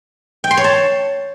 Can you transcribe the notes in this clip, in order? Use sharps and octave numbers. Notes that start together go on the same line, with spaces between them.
G5
C6
C#5
A5